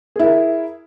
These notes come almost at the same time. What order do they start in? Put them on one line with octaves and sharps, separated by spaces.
G#4 E4 A#4